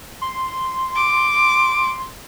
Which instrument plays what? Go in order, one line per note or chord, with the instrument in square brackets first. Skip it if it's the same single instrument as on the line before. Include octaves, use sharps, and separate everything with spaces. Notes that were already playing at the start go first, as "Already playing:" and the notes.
[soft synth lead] C6
[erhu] D6